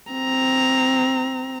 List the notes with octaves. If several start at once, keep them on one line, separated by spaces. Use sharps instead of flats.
C4 A#5